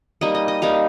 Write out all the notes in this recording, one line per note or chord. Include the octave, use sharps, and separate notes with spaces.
G3 A#3 D#4 D#5
D#5
D#5
G3 A#3 D#4 F5